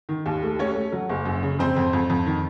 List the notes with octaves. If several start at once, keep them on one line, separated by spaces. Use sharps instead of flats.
D#3
D#2
A3
A3 C#4 C#5
A3
F#3
F#1
F#2
C#3
F2 C4 C5
F2
F2
F2
D#3